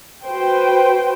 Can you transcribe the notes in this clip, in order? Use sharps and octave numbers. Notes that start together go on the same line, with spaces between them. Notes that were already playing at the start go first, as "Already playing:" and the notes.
F#4 B4 C5 G5